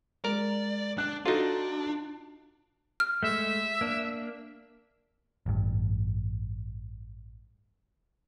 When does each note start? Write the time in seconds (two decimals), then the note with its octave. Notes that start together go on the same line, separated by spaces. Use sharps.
0.24 G#3 A#4 D5
0.98 D4 F#6
1.26 D4 D#4 F4 F#4 A4
3.00 F6
3.23 G#3 A3 E5
3.81 A#3 D4
5.46 A1 G2